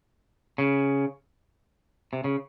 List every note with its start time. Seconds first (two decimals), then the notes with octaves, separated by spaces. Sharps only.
0.58 C#3
2.13 C3
2.24 C#3